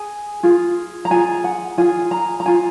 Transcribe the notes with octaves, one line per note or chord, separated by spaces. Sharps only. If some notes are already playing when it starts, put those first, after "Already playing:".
Already playing: G#4 G#5
F4 G#4
A#5
F4 G#4 G#5
F#5
F4 G#4 G#5
A#5
A#5
F4 G#4 G#5